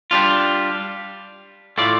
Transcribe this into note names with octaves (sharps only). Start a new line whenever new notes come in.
G3 D4 F4
A2 A3 F4 D5